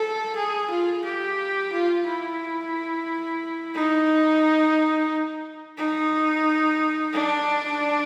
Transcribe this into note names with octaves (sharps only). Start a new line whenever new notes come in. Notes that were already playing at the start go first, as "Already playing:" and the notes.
Already playing: A4
G#4
F4
G4
F4
E4
D#4
D#4
D4